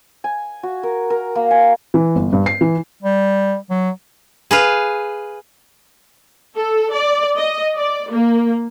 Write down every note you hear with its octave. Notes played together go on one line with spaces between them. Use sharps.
G#5
F#4
A#4
A#4
A#3
G#5
E3
G1
G2
C7
E3
G3
F#3
G#4 B4 F5
A4
D5
D#5
D5
A#3